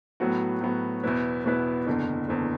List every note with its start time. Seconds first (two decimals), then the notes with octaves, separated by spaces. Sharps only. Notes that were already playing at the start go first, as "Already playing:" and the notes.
0.20 A2 F#3 B3 F#4
0.61 A2 F#3 B3 F#4
1.03 E2 B2 B3 E4 B4
1.45 E2 B2 B3 E4 B4
1.87 F#1 E2 D3
2.28 F#1 E2 D3